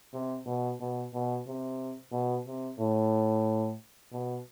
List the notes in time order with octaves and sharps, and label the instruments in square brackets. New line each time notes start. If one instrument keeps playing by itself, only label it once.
[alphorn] C3
B2
B2
B2
C3
B2
C3
A2
B2